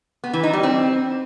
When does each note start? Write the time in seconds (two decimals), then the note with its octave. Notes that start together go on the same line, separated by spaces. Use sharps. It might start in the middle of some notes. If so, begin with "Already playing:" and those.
0.24 B3
0.33 E3
0.43 D#4
0.53 G3
0.63 C4